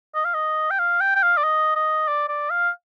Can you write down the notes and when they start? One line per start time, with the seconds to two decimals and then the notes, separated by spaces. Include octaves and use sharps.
0.15 D#5
0.25 F5
0.34 D#5
0.71 G5
0.79 F5
1.01 G5
1.15 G5
1.23 F5
1.37 D5
1.44 D#5
1.76 D#5
2.08 D5
2.28 D5
2.50 F5